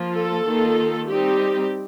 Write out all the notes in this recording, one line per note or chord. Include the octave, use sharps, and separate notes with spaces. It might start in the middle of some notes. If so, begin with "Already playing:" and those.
Already playing: F3 A#3 F4
A4
D#3 A#3 F4
G3 C4 D#4 G4